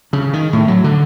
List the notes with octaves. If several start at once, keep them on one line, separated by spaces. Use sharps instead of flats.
C#3
D#3
A2
F#3
D3